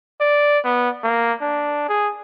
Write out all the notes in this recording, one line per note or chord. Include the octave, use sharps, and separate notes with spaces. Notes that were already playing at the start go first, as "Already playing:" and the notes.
D5
B3
A#3
D4
G#4